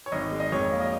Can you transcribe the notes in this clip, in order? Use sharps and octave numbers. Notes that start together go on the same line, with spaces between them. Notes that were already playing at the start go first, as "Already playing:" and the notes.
C#5
G#1 D#5
G#3
D#5
F2 C#5
A#3
D#5